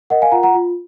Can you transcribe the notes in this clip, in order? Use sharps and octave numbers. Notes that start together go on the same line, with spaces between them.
A#4 D#5 F#5
F5 G#5
F4 F#5 A#5
F#5 A#5
F4